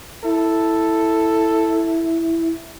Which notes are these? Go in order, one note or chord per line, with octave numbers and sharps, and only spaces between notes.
E4 A4